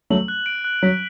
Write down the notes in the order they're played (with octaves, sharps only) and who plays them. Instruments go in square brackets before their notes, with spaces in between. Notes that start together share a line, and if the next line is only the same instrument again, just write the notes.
[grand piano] F#3 A3 [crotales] F#7
[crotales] F#6
D7
F#6
[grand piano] F#3 [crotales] B6